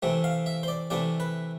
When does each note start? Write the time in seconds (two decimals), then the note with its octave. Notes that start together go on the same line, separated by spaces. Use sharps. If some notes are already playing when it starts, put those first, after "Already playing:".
0.02 C3 E3 A3 C4
0.24 F5
0.46 E5
0.63 C5
0.68 D5
0.90 C3 E3 A3 D5
1.20 B4